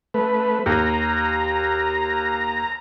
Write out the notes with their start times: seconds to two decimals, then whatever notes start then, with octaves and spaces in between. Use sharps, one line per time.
0.14 A3 B4
0.66 D#2 A#5